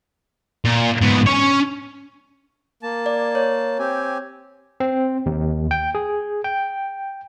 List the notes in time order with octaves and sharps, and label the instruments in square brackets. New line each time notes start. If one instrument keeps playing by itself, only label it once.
[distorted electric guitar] A#2
G#2 B3
C#4 C#5
[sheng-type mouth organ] A#3 A5
[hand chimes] D5
C#5
[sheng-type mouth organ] C4 G4 G#5
[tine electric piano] C4
D#2
G5
G#4
G5